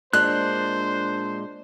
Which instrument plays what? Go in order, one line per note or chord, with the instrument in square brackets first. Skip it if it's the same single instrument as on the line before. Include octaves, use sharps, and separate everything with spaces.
[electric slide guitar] A#2 G#3 [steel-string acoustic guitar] D4 [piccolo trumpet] C5 [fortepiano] F#6